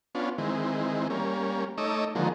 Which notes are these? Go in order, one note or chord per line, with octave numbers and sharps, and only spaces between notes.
B3 C#4 D4 F4
D#3 E3 G#3 C4
G3 A#3 C#4
A3 D#4 C#5 D#5 D6 E6
D3 D#3 F3 F#3 G#3 A#3